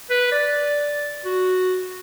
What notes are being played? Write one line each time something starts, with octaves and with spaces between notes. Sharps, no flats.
B4
D5
F#4